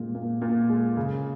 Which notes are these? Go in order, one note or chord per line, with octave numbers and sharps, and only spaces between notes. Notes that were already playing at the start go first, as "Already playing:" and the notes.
Already playing: A#2 G#3 C4
A#2
A#2
G#3
C#3